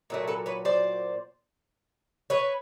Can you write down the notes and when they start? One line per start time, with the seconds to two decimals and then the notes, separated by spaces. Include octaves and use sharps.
0.10 A#2 F#3 A3
0.28 A4 B4
0.46 B4 C#5
0.65 C5 D5
2.30 B4 C#5